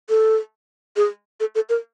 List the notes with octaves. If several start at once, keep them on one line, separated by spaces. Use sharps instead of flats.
A4
G#4
A4
A4
A#4